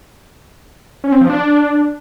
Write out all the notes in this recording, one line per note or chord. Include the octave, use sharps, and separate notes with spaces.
C#4
C4
F3
D4